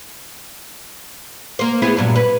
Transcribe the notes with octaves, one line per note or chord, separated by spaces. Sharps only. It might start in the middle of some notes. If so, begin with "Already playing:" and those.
A#3 C5
B3 E4 G#4
G2 A#2 F#3
B4